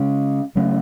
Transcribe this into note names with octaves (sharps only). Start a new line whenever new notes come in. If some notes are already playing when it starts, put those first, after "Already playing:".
Already playing: C#3 G#3 C#4
C#3 F#3 A3 C#4